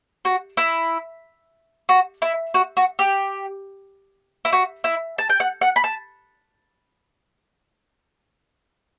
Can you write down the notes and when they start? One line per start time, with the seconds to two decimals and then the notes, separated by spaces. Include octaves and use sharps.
0.25 F#4
0.57 E4
1.89 F#4
2.22 E4
2.54 F#4
2.77 F#4
2.99 G4
4.45 E4
4.53 F#4
4.84 E4
5.18 A5
5.30 G5
5.40 F#5
5.61 F#5
5.76 B5
5.84 A5